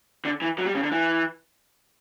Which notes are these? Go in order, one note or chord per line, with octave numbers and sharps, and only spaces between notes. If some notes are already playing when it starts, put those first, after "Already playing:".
D3
E3
F#3
G3
C#3
D3
E3